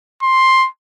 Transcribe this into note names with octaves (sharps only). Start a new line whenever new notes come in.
C6